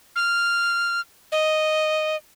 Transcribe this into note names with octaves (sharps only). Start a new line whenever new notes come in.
F6
D#5